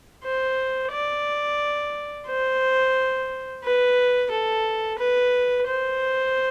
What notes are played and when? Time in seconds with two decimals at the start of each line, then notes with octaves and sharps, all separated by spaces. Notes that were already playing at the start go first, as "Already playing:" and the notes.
0.25 C5
0.92 D5
2.28 C5
3.64 B4
4.31 A4
4.99 B4
5.67 C5